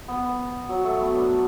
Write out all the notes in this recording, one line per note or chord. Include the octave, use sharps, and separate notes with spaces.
B3
F#3
A3
B3
D4